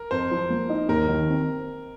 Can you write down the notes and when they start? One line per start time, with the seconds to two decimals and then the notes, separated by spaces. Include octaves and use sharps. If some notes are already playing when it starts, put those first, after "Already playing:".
Already playing: A#4
0.11 F2 C5
0.31 F3
0.50 A#3
0.69 D#4
0.89 D#2 A#4
1.08 D#3
1.28 C4